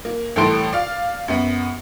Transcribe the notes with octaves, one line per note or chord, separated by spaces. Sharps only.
A#3
C2 A2 E3 A4 C6 D7
D5 F5
F#2 B3